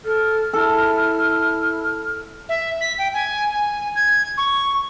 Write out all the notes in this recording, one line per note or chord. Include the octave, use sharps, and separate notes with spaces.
A4 F6
E4 A4
E5
B6
G5
G#5
G#5
G#6
C#6